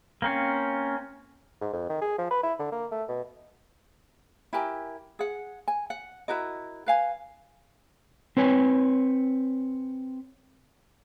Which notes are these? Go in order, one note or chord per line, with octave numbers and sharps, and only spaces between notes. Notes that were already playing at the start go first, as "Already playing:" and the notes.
A#3 C4 C#4
G#2
F2
D#3
G#4
F3
B4
E4
D3
A#3
A3
B2
E4 G4 A#4 G#5
G#4 F#5
G#5
F#5
E4 F#4 A#4 D#5
B4 F5 G#5
C4 B4 C#5 G#5